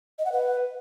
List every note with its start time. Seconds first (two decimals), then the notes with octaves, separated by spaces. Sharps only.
0.18 D#5
0.25 F#5
0.32 B4